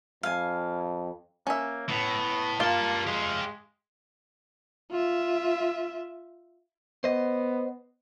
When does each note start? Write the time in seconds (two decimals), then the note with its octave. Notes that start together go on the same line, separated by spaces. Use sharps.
0.23 F2 F5 G#5
1.47 A#3 C#4 E5
1.89 A2 B3
2.60 A#3 F4 G4 A5
3.07 G#3 G4 F5
4.91 F4 E5
7.04 B3 C5 D#5